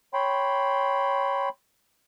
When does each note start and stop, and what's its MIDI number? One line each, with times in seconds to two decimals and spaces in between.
0.14 1.49 73
0.14 1.49 79
0.14 1.49 83
0.14 1.49 84